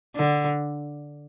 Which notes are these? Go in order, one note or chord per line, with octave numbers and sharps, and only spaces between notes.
D3